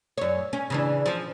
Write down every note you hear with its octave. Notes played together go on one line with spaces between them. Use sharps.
F#2 C#5
C#4
C#3 E3 D4
F3